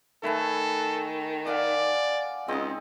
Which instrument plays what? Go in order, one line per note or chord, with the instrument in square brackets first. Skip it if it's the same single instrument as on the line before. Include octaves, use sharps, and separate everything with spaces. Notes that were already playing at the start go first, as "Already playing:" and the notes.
[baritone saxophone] D#3 [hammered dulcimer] A3 B4 G#5 [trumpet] A4
[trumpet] D5 [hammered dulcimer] F5 F#5 G#5
[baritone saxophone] C#2 [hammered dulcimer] C4 D#4 [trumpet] D#5